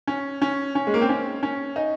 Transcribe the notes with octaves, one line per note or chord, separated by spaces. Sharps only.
C#4
C#4
C#4
G#3
A#3
C4
C#4
C#4
D#4